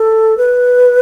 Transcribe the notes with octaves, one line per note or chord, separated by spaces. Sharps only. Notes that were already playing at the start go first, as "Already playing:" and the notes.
Already playing: A4
B4